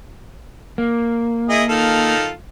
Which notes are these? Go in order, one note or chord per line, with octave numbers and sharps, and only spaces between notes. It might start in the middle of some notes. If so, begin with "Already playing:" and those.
A#3
E4 G#4 D#5
D#3 F4 A4